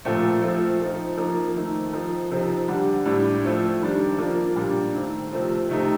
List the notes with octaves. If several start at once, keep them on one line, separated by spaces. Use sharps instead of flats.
A#2 F3 A3 C4
F3 A3 C4 F4
F3 C4 D#4
F3 A#3 D#4
D#3 A3 C4 D#4
F3 C4 D#4
C3 F3 C4 D#4
D3 G3 D4
A2 G3 D4
F3 A3 C4 F4
D#3 G3 D4
F3 A#3 D4 F4
A#2 G3 D4 F4
D#3 A3 C4
C3 F3 A3 C4 F4
C3 D#3 A3 C4 D#4